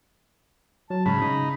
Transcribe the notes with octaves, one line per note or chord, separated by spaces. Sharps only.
F#3 A5
G#2 C#3 A5 B5
C#3 D#4